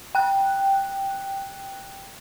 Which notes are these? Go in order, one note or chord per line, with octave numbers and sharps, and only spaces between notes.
G5 F#6